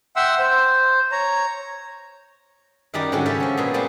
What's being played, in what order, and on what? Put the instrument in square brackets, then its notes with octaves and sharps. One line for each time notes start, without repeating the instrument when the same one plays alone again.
[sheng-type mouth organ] E5 F#5 G5 C6 E6
C5
C#5 A#5
[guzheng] F#2 D#3 G3 G4 D5 A#5
G#2 D3 F#3 C#4 F#4 G4
C#3 A4 C#5 E5 A5
F3 C#4
A#2 B3 G#4
F#3 G3 A#3 C4 G4